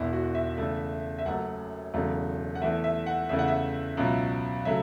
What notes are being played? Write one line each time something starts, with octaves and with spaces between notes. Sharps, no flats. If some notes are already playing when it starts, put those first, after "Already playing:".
Already playing: E1 E2 B2 E4
F#4
E5
E2 C#3 A3
E5
F#1 F#2 F#3 A3 F#5
E1 E2 C#3 F#3 A3
F#5
E2 E3 A3 E5
E5
F#5
E2 C#3 E3 A3 E5
F#5
E5
C#2 B2 F#3
C#3 F#3 A3 E5